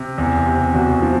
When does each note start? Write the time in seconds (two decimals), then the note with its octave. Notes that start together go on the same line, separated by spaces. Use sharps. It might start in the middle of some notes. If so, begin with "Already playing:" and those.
Already playing: C3
0.18 E2
0.46 C3
0.74 E2 F#4
1.02 F3